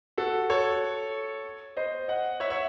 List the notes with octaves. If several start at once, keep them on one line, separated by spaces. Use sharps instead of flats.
F#4 A4
A4 C#5
C5 D#5
D#5 F#5
C#5 E5
C#5 E5